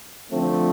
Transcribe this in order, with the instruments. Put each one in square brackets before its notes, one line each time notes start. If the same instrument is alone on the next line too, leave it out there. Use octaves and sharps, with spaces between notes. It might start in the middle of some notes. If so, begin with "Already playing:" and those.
[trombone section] D3 F3 A3 C4